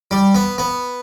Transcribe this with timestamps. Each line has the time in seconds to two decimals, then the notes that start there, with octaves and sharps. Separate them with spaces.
0.11 G3
0.35 B3
0.58 B3